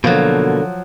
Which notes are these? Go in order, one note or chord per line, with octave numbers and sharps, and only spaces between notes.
B2 D3 F3 F#3 A#3